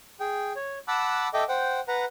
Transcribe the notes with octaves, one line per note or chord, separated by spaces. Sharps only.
G#4 G5
C#5
F#5 A5 B5 D6 E6 F#6
A4 D#5 E5 G5 D6
C5 F#5 G5
B4 F#5 A#5